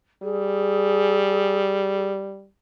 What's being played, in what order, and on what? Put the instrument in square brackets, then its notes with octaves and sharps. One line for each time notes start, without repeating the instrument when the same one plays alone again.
[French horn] G3 [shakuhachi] G#4